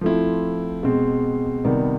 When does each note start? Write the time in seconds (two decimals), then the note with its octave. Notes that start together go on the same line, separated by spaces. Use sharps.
0.01 F3 A3 C4 E4
0.83 B2 G#3 C4
1.65 C3 D#3 G3 B3